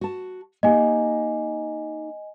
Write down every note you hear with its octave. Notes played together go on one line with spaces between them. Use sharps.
F#4 A5
A#3 D#4 G4 D#5 G#5